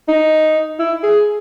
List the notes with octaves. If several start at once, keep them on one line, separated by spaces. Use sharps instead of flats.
D#4
E4
G#4